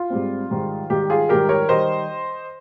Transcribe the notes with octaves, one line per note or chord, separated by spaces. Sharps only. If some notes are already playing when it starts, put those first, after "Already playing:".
Already playing: F4
G#2 G3 C4
G#2 D#3 G3
G#2 D#3 G3 G4
F4 G#4
G#2 D#3 G3 G4 A#4
A#4 C#5
D#3 G3 C5 D#5